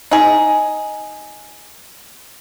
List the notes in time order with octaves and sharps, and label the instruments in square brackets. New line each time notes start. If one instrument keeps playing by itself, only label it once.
[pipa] D#4 G#4